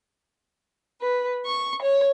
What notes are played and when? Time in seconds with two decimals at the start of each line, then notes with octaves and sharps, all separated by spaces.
1.00 B4
1.45 C#6
1.80 C#5